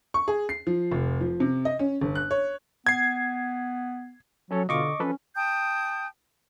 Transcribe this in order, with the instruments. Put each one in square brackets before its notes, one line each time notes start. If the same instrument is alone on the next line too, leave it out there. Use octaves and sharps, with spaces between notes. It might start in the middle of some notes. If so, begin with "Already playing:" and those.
[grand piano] C#6
G#4
C7
F3
F1
F3
C3
D#5
C#4
G1
F#6
C#5
[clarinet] B3 [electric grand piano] G#6 C7
[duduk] F#3 [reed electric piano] C#4 A4 C#5
[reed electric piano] B2 F4 [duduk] D3 [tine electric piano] D#5 C#6 D6
[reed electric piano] F3 A4 B4 [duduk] C#4
[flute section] G5 A5 D#6 G6